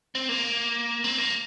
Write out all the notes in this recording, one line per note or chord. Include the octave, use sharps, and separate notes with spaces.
C4
A#3
C4
A#3